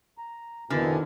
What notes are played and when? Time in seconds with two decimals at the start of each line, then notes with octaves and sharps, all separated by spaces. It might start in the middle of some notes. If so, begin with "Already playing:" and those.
0.18 A#5
0.70 F2 B2 D3 D#3 B3 E4 G#5 F6